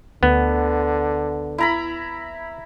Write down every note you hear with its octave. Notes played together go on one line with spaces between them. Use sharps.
D2 D3 B3
E4 A#5 B5